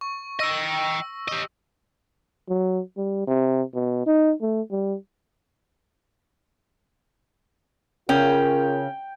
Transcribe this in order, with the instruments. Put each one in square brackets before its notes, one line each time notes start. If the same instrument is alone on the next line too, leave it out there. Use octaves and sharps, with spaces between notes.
[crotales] C#6
[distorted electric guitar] D#5 G5 [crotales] E6 A#6
[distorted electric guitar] G4 D#5
[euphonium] F#3
G3
C3
B2
D#4
A3
G3
[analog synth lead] C#3 [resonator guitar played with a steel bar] C#4 [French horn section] F4 G#4 A#4 [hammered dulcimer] G5